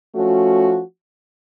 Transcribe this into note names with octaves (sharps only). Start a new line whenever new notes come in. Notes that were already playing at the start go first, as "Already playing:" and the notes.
F3 A3 C#4 F#4